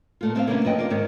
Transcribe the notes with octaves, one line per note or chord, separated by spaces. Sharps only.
A#2 A3 F4
A3 C4 A#4 D5 E5 F5
C#3 A#3 B3 C#4 D4 E4
F#2 F3 B4 D#5 G5
F4 A#4 D5
G#2 D#3 A#4 C#5